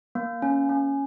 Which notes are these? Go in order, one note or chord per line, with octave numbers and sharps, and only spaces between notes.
A#3
C#4
C#4